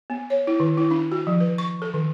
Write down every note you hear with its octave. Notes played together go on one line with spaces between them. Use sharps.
B3
C#5
E4
D#3
E4
D4
F#4
F3
B4
C#6
A4
D#3